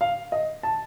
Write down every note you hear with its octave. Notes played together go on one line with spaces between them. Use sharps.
F5
D#5
A5